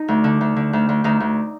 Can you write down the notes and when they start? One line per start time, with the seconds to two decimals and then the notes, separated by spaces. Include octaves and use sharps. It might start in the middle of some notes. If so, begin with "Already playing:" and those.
Already playing: D#4
0.08 D2
0.24 D3
0.41 D2
0.56 D3
0.73 D2
0.89 D2
1.04 D2 D#4
1.20 D2